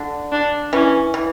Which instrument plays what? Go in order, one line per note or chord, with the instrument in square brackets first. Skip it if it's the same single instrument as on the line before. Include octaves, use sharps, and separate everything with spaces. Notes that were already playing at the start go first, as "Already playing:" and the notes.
Already playing: [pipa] D3
[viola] D4
[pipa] E3 [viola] C#4
[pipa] E3